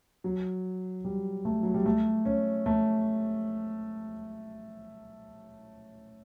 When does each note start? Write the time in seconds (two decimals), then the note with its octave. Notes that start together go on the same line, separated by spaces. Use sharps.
0.24 F#3
1.05 G3
1.45 A3
1.63 F#3
1.74 G3
1.86 A3
2.25 C#4
2.66 A3